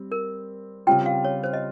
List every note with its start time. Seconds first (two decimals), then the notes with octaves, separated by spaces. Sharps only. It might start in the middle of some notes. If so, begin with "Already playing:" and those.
Already playing: G3 C4
0.12 A#4
0.87 C#3 G3 C4 F4 G5
1.06 F5
1.24 C#5
1.43 C5
1.53 D#5